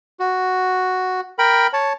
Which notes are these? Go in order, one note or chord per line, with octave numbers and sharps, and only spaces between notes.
F#4
A#4 G5 B5
C#5 A5